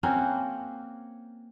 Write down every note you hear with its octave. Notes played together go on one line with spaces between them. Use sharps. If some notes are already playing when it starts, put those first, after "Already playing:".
A#3 C4 C#4 F#4